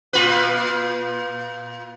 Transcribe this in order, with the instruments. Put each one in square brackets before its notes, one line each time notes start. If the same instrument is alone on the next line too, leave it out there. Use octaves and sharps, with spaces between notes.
[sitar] A#2 F4 B4